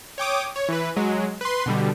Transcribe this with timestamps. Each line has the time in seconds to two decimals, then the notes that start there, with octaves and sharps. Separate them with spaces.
0.18 C#5 G5 D6 D#6
0.56 C#5
0.68 E3 B4
0.96 F#3 G#3
1.41 B4 C6
1.66 B2 D3 G3